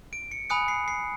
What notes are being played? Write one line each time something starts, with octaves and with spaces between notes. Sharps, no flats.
D7
C#7
G#5 B5 D#6 F#6 C#7
C7
C7